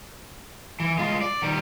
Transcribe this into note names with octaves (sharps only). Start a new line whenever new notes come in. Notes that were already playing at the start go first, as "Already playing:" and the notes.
E3
G#3 F4
D5
D#3 G3